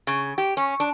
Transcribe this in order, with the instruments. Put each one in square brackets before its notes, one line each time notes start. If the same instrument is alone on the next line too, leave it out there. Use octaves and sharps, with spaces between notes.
[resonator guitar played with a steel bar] C#3
G4
C#4
D4